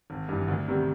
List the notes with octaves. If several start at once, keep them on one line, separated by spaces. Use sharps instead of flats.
G#1
G2 E3
D2
C3 D#3 G3 B3